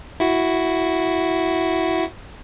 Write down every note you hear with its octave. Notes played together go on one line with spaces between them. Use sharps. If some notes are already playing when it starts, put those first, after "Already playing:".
E4 F#4